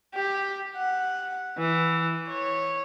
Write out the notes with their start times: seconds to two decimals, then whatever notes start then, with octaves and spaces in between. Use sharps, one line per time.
0.15 G4
0.77 F#5
1.58 E3
2.28 C#5